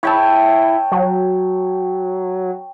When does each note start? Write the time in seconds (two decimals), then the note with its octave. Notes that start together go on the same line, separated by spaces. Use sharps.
0.03 E4 C#5 G5 A5
0.92 F#3